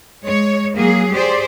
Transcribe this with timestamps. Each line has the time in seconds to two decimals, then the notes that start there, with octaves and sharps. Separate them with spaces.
0.22 G#3 C#5
0.76 F#3 A#3 G#4
1.13 G4 G#4 C5 D5